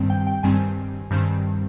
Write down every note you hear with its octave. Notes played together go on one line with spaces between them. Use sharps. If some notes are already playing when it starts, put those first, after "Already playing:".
Already playing: G2 D#3 G3 C4
G5
G5
G2 D#3 G3 C4 G#5
G2 D#3 G3 C4